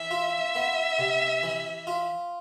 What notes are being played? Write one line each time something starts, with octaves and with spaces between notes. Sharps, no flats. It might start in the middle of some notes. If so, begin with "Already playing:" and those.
Already playing: E3 E5
F4
B3
C3
E3
F4